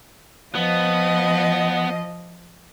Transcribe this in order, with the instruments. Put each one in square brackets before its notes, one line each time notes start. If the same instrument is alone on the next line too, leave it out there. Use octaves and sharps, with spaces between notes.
[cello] F3 D#5 [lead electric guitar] B3